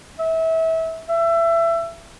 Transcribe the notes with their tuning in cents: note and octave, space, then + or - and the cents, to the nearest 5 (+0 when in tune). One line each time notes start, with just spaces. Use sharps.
E5 -25
E5 +25